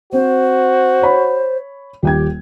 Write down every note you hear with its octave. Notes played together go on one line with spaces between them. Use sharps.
C4 F#4 C5
C#5 B5
D#1 G4 G5 G#6